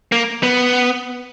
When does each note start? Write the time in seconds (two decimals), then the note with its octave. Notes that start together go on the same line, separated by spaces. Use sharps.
0.12 A#3
0.43 B3